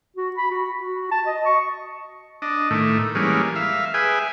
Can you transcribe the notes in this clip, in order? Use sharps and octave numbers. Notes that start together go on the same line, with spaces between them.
F#4
B5
F#4
F#4
A5
D#5
C#6
D4 D#5
A2 D#3 A3
E3 G3 G#3 A#3 C#4
E5 F5
G#4 B4 E5 G5 G#5